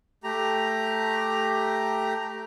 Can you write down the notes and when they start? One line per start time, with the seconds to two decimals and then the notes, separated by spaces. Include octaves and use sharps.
0.24 A3 G4 A#5